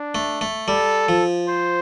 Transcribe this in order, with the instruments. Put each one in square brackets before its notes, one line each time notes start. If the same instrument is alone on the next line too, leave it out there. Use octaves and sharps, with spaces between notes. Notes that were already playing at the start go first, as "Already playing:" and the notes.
Already playing: [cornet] D4
[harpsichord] A3
A3
[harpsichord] G3 [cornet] A4
[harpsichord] F3
[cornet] C5